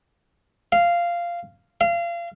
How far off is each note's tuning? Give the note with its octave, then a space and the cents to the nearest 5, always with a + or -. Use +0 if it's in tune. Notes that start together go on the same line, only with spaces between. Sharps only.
F5 -10
F5 -30